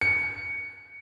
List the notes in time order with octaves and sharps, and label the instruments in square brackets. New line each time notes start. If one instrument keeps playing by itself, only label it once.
[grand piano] C#7